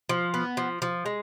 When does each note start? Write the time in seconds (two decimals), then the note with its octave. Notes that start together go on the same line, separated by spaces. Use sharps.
0.09 F3
0.34 B3
0.57 F3
0.82 F3
1.06 G#3